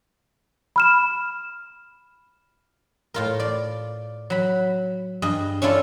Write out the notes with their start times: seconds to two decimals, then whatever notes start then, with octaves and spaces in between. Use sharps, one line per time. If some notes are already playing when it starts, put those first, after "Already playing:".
0.76 B5 F6 E7
3.14 A2 F4 A#4
3.40 D5
4.30 F#3 B5
5.22 G2 G#4 D#5
5.62 C#4 D4 E4 F4 A4